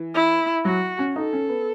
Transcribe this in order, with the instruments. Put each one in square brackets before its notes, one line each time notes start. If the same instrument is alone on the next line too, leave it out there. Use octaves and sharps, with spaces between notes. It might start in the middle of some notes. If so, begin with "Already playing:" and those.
Already playing: [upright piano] E3
[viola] E4
[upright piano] F#3 [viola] F#4
[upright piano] C#4
[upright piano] D#4 [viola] A4
[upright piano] C#4
B3